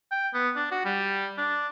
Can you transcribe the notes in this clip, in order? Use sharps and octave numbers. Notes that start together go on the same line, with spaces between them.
G5
B3
D4
F#4
G3
D4